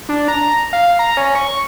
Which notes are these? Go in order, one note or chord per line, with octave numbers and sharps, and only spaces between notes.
D4
A#5
F5
A#5
C#4
C#6